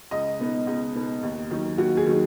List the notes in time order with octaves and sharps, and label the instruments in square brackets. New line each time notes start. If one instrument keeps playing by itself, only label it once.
[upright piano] C#2 D#5
B2 B3 D#4
C#2
B2 B3 D#4
D#2
D#3 F#3 D#4
D#2 F#4
G#4
D#3 F#3 D#4